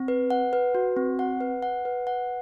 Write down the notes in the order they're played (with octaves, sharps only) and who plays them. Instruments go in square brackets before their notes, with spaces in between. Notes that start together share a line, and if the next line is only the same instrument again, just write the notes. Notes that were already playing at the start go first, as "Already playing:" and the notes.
Already playing: [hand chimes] C4
B4
F#5
B4
F#4
C4
F#5
B4
F#5
B4
F#5